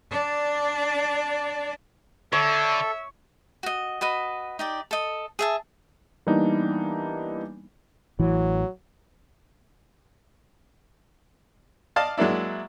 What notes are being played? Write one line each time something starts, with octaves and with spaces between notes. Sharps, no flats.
D4 D5
D3 A4 C#5 E5
F#4 D#5
F#4 B4 D#5
D#4 G4 D5
A4 D#5
G#4 E5 A5
E3 G3 A#3 B3 D4 D#4
A1 E3 F#3
D5 D#5 F5 A5
F#3 G#3 A#3 D4 E4